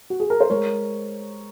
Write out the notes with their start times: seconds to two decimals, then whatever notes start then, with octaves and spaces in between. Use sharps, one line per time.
0.10 F#4
0.20 G#4
0.30 A#4
0.40 C5
0.50 G#3 A#4 C#5